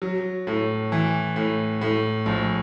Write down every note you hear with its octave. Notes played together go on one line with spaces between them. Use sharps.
F#3
A2
E3
A2
A2
A#1